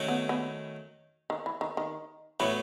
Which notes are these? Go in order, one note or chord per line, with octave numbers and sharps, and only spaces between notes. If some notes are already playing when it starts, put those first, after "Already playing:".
Already playing: D#3 F#3 A3 C#4
B3
B3
D#3
E3
D#3
D#3
A2 E3 F#3 B3